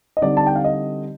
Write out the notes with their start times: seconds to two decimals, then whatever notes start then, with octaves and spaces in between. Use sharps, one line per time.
0.17 D#5
0.22 D3 G3 C4 D#4 D5
0.37 A5
0.47 G5
0.56 F5
0.64 D#5